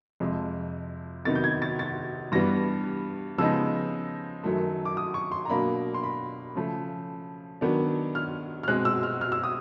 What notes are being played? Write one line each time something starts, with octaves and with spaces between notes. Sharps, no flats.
F2 C3 F3 G#3
C3 D#3 F#3 B3 D#4 A6
G6
G#6
A6
A6
G2 E3 G3 B3 A#6
C#3 F3 G#3 B3 D#4 E6
F#2 D#3 F#3 A3
D6
D#6
C#6
C6
A#5
B2 F#3 A#3 D4 B5
C6
B5
C#3 F3 A3
D#3 F#3 B3 D4
F6
F6
B2 G#3 C4 F#6
E6
F6
F6
E6
D#6